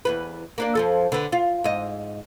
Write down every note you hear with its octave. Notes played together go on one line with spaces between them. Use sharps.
E2 G2 B4
A#3 D4 D5
F2 F3 A4
D3 B4
F4
G#2 D#5